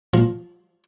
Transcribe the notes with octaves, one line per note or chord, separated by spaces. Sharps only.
A#2 F3